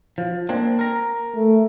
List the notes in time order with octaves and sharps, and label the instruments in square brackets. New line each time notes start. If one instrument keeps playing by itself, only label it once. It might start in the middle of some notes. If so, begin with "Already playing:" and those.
[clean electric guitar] F3
A#3 C4 D4
A#4 A#5
[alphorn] A3